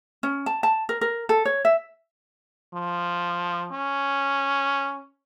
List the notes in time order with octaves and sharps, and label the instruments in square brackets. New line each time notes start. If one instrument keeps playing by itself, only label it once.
[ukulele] C#4
A5
A5
A#4
A#4
A4
C#5
E5
[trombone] F3
C#4